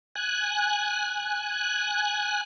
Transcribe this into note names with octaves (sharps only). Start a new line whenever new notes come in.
G#5 F#6